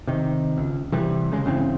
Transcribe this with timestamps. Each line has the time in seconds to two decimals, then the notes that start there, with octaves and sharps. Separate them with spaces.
0.07 C3 D#3
0.58 C#2
0.92 C3 E3 G3
1.32 C#3 G#3
1.45 G1 C#3 E3 C4